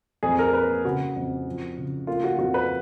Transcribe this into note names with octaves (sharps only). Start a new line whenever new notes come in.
F2 G#4
A#4
A#3 B4
C#3 F#4
F2
F3
C#3
A#3 F4
F#4
F2 F#4
B4